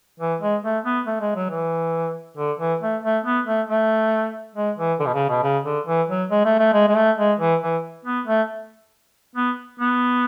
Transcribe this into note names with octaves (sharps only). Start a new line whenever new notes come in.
E3
G#3
A3
B3
A3
G#3
F#3
E3
D3
E3
A3
A3
B3
A3
A3
G#3
E3
D3
B2
C#3
B2
C#3
D3
E3
F#3
G#3
A3
A3
G#3
G#3
A3
G#3
E3
E3
B3
A3
B3
B3